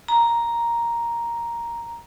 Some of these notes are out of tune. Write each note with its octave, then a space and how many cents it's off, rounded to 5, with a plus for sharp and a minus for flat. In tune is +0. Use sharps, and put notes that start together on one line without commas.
A#5 +5